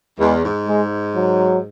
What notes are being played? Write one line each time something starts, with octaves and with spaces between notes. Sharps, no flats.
E2 G#3
G#2
G#3
F#3